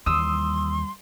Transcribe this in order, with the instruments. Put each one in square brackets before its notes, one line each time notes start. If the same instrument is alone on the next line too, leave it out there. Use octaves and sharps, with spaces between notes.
[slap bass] D#2 E3 [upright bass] G3 [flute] C6 [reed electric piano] D#6 E6